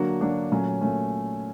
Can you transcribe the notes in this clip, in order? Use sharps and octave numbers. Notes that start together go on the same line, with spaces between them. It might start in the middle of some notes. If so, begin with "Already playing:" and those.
Already playing: D3 F#3 A#3 D4 F#4
D3 F#3 A#3 D4 F#4
A#2 F#3 A3 C#4
A#2 F#3 A3 C#4